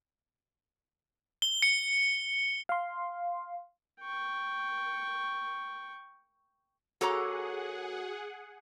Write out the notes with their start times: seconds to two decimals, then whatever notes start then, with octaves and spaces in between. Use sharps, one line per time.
1.42 G7
1.62 C#7
2.69 F5 C6
4.01 G5 C#6
7.01 A#3 F#4 G#4 A4 C#5 F#5 A#5 D6